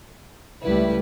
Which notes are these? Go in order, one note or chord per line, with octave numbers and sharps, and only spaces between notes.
C#2 G3 A3 E4 B4